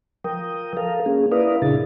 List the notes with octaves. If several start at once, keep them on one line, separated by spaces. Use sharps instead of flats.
F3 A#4 G5 D#6
A4 A#4 F5
A#3 C#4 G#4
E4 A#4 B4 D5 F5 D#6
A#2 C#3 D4 E4 G#4 A6